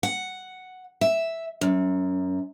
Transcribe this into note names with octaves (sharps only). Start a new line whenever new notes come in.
F#5
E5
F#2